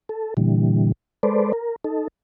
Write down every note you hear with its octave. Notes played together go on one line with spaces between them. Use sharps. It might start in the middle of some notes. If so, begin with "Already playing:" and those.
A4
A#2 D3 E3 G3
G#3 A4 B4 C5 D5
A#4
D#4 A4